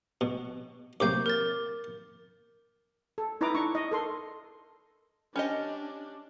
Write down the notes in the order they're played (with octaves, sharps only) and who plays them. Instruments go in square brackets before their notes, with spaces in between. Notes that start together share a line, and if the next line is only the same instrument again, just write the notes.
[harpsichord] B2
[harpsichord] F#2 C3 A#3 [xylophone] D6 G6
[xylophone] A#4 A6
[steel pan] A4
D#4 E4 B4 D#5 A#5 D6
D4 C#6
D#5
A4 A#4 C6
[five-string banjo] C#4 G4 D#5 [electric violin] D4